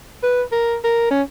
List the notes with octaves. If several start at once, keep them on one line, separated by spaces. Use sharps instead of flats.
B4
A#4
A#4
C#4